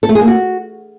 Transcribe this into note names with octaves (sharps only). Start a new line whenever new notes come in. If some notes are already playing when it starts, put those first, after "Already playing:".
A4
A3
G#4
A#3
F#4